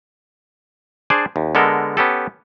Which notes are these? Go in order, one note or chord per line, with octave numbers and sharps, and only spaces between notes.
D4 G#4 C5 D5
D#2
D3 G#3 B3 A4 A#4
B3 C#4 G4 A4